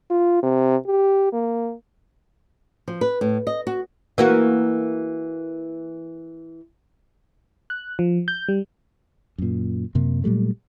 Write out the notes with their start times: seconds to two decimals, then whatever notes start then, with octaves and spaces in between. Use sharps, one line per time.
0.10 F4
0.43 C3
0.87 G4
1.33 A#3
2.88 F3
3.01 B4
3.21 A2
3.47 D#5
3.67 F#4
4.18 E3 A#3 F#4
7.70 F#6
7.99 F3
8.28 G6
8.48 G3
9.38 F#2 A#2
9.95 F#2 C3 A#3
10.24 A#2 F#3 G3 A3